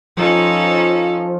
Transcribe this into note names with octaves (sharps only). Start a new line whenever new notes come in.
F3 C#4 D#4 A4